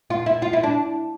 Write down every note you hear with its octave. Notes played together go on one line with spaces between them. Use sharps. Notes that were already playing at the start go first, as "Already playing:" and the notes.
F4
E4
F4
E4
D4